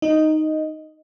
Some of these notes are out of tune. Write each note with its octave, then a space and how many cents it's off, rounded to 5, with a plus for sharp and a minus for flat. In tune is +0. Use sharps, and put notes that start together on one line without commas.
D#4 +0 D#5 +0